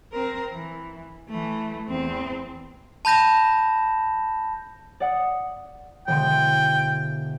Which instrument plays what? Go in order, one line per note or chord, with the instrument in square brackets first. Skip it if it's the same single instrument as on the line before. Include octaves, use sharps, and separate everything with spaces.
[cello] C4 A#4
E3
E3 A3
E2 C4
[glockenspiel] A5 B5 G6 A#6 E7
[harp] D5 F#5 D#6
[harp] E1 D3 C6 [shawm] G5